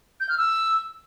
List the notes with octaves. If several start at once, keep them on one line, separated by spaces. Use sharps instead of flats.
G6
F6
E6